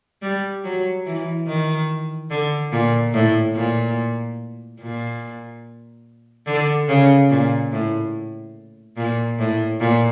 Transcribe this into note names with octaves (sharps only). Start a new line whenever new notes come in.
G3
F#3
E3
D#3
D3
A#2
A2
A#2
A#2
D3
C#3
A#2
A2
A#2
A2
A#2